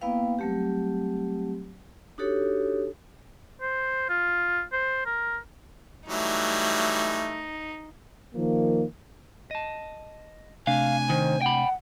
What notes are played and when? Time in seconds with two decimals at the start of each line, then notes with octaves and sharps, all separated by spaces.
0.01 A#3 B3 E4 B4 F5 G5
0.39 F#3 G3 A3 C4 G4
2.18 D4 D#4 F#4 G4 A4 C#5
3.61 C5
4.09 F4
4.72 C5
5.06 A#4
6.09 E3 F#3 G3 A3 D#4
8.35 D#3 F3 A#3
9.51 D#5 A5
10.67 C3 A3 D4 F5 G#5
11.10 D#3 C5
11.42 F#5 G5 B5